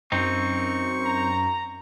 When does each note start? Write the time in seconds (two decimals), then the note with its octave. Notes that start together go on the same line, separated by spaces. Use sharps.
0.12 F#2 C4 D#4 C#6
1.04 A#5